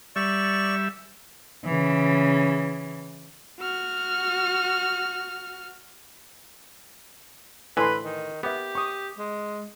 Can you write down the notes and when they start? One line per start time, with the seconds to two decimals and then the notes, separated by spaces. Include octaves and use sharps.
0.16 G3 D5 E5 C#6
1.65 C#3 E3
3.60 F#4 F6
7.77 A2 D3 E3 B4 G#5 C6
8.04 D#3
8.43 B3 G4 A#4 E5
8.75 C#6 D#6
9.19 G#3